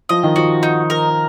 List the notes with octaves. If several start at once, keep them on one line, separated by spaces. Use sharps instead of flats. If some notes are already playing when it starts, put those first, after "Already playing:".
F3 D#5
D#3
F3 F#4
D#4
A#4